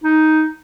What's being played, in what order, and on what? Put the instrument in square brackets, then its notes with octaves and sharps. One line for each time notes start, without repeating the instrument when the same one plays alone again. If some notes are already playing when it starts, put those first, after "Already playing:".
[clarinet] D#4